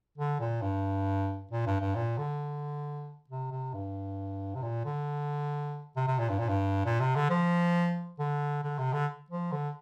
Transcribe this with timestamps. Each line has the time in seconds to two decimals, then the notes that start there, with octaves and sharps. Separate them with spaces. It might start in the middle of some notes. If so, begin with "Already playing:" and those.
0.18 D3
0.40 A#2
0.62 G2
1.51 A#2
1.66 G2
1.81 G2
1.95 A#2
2.18 D3
3.30 C3
3.51 C3
3.73 G2
4.55 C3
4.63 A#2
4.85 D3
5.96 C3
6.07 C3
6.19 A#2
6.30 G2
6.39 A#2
6.49 G2
6.85 A#2
7.00 C3
7.15 D3
7.30 F3
8.19 D3
8.63 D3
8.79 C3
8.93 D3
9.30 F3
9.52 D3